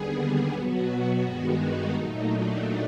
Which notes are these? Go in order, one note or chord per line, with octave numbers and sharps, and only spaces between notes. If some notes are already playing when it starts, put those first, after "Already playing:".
Already playing: D#2 D3 G3 B3 G#4
G#4
B2 F#3 B3 F#4
G2 D#3 G#3 B3 F#4
D#4
A#2 F#3 A3
D4